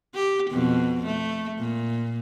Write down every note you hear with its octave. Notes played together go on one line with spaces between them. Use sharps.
G4
F2 B2
A3
A#2